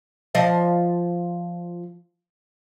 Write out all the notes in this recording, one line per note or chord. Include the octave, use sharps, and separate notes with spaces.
F3 D5 D#5